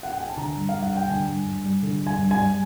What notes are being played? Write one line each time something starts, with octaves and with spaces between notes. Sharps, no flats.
F#5
G5
G#5
A5
D3 A#5
G2
G2 F5
F#5
G3 G5
D3 G#5
G2
G2
G3
D3
G2
G#5
G2
G#5
G3